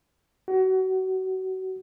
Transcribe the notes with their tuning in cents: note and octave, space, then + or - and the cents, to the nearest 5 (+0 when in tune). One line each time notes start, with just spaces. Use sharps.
F#4 +30